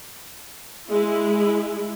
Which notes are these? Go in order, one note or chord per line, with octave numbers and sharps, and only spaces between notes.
G#3 E4